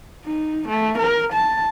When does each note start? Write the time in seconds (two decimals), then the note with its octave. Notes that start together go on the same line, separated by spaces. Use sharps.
0.25 D#4
0.68 A3
0.98 A#4
1.33 A5